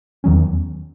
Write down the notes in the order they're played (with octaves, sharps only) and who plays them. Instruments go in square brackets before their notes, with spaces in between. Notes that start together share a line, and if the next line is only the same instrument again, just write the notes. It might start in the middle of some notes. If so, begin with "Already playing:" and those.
[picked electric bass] E2 D#3 F#3 C#4